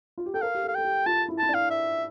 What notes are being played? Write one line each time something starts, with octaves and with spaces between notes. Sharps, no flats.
F4
G4
A4 G5
A#4 F5
G4
A4 F5
A4 G5
G4
F4 A5
E4
E4 A5
D4
F5
E5